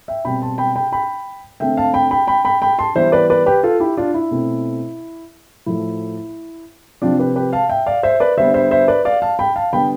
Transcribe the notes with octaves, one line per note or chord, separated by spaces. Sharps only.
E5 G5
B2 G3 C4 G5 B5
A5 C6
G5 B5
G5 B5
G5 B5
D3 A3 C4 E5 G5
F5 A5
G5 B5
G5 B5
G5 B5
G5 B5
G5 B5
A5 C6
E3 G3 B3 C5 E5
B4 D5
B4 D5
G4 B4
F4 A4
E4 G4
D4 F4
E4
B2 A3 C4
A2 F3 A3 E4
C3 F3 C4 D4 F4
G4 B4
G4 B4
F5 A5
E5 G5
D5 F5
C5 E5
B4 D5
D3 G3 B3 C5 E5
C5 E5
C5 E5
B4 D5
D5 F5
F5 A5
G5 B5
F5 A5
D3 G3 B3 G5 B5